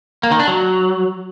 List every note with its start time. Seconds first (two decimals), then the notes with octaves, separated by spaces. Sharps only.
0.23 A#3
0.31 D#3
0.40 D4
0.48 F#3